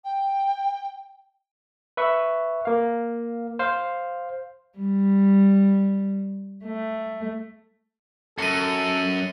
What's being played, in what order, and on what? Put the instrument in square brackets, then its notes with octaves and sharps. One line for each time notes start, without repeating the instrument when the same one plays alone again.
[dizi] G5
[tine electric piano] B4 E5 C#6
A#3 F5
C5 F5
[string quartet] G3
A3
[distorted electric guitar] F#2 [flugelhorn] A4 [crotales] C#7 D#7